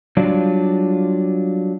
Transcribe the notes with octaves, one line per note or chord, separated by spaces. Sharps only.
F#3 G3 D4 F4